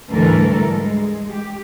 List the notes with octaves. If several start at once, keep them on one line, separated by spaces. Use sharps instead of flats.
D2 G#2 E3 G3 A4 A#4
G#3
G4